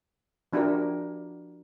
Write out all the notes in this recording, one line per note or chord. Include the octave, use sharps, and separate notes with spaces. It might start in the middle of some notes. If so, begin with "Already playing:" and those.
F3 D4 E4 F#4 G4 A#4